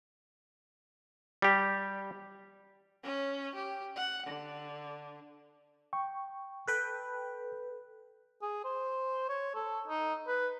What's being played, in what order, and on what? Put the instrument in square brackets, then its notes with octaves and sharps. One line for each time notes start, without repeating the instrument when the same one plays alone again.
[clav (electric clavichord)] G3 G4
[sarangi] C#4
G4
F#5
D3
[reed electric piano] G5 C#6
[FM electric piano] A4 B4 G5 [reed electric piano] F#6
[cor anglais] G#4
C5
C#5
A4
D#4
B4